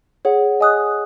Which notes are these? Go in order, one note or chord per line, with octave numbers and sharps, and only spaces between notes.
G#4 C#5 F#5
D#5 G#5 D#6 F#6